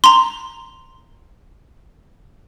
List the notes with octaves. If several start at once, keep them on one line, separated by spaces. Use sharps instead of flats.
A#5 C6